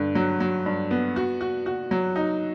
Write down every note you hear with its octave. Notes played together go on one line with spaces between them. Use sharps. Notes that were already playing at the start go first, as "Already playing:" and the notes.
Already playing: G2 D3
F#3
F#3
G2
B3
F#4
F#4
F#4
F#3
D#4